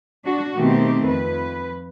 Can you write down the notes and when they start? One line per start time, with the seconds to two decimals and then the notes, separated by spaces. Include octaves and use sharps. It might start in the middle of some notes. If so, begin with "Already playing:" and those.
0.25 D4 F#4
0.55 B2 D#3 A3 C4 G4
1.06 F2 B4